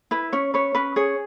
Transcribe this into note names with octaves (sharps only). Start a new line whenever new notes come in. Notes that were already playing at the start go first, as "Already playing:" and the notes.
E4 B4
C#4 C#5
B4 C#5
C#4 B4
G#4 C#5